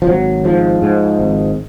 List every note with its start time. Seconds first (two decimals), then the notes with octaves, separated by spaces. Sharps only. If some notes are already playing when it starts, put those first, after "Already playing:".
0.02 F3
0.07 G#1 F#3
0.44 G#2 F3
0.82 G#2
1.19 G#1